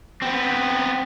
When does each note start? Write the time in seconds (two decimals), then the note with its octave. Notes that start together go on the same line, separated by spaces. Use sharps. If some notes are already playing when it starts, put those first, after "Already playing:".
0.22 B3 C4